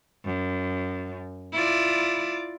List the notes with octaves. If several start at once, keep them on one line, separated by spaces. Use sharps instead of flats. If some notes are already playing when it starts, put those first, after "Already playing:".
F#2
E4 F4 D5